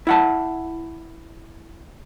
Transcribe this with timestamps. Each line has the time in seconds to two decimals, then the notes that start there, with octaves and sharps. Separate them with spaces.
0.07 E4 F#5 A5